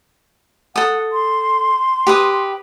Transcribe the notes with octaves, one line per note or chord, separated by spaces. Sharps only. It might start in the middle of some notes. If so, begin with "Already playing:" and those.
A4 F#5 D#6
C6
G4 B4 D#6